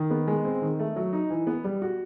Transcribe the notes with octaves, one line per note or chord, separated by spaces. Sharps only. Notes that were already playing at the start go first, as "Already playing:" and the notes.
Already playing: D#3
B3
G#3
C4
D#3
A3
F#3
D#4
E3
B3
G3
F#4